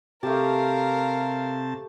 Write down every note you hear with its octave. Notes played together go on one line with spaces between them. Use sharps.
C3 A3 G4 A#4 F5 A5